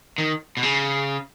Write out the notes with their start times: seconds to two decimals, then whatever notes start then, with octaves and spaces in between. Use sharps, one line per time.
0.18 D#3
0.57 B2
0.63 C#3